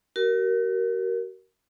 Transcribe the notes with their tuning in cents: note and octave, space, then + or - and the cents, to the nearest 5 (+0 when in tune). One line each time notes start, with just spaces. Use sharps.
F#4 +45 A#4 +0